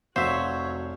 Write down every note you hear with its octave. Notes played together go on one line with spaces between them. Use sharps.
F1 F#3 F#4 C5 C#5 E5 F5